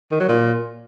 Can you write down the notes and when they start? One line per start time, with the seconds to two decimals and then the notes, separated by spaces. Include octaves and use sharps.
0.12 D#3
0.20 F#3
0.28 A#2